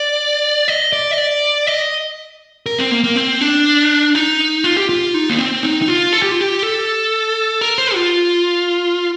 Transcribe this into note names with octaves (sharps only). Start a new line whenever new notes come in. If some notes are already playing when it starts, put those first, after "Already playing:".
Already playing: D5
D#5
D5
D#5
D5
D#5
A#4
C4
A#3
A#3
C4
D4
D#4
F4
G4
F4
D#4
A#3
C4
D#4
D#4
F4
A4
G4
F4
G4
A4
A#4
C5
F4